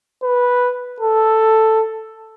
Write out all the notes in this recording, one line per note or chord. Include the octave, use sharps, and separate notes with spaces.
B4
A4